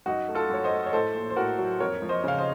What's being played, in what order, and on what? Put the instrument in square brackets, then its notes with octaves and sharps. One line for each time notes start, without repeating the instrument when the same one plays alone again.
[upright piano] F#2 D#4 F#4
A3
F4 A4
F#2 C#5
C5 D#5
A3
C#5
A2 A4 C5
A#1
C5
A2 F#4 A#4
F#3
F2 A#4 C#5
F3
C5 D#5
C#3 F5
C5 D#5